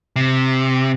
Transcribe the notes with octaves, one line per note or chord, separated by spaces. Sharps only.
C3